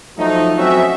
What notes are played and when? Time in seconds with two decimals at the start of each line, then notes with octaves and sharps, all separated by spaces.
0.18 F3 F#3 A3 D#4
0.56 F#3 C4 C#4 F#4 E5